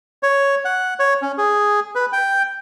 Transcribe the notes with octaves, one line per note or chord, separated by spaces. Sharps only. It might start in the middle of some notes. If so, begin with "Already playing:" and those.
C#5
F#5
C#5
C#4
G#4
B4
G5